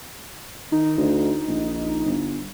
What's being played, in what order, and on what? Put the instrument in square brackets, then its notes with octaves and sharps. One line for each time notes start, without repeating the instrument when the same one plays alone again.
[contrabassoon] D#3 [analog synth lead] D#4
[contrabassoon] D2
A#1
G1